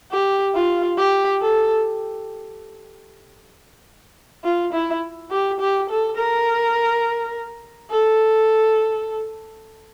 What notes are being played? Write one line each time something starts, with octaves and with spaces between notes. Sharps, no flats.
G4
F4
G4
A4
F4
E4
G4
G4
A4
A#4
A4